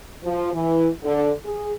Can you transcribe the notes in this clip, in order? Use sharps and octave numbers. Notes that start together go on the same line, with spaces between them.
F3
E3
D3
G#4